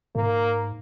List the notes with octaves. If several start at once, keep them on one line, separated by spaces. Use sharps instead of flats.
G#2 A#3